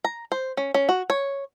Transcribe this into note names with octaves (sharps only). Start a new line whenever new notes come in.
A#5
C5
C#4
C#4
F#4
C#5